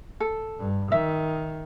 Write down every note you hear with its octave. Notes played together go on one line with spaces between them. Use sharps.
A4
G2
D#3 E5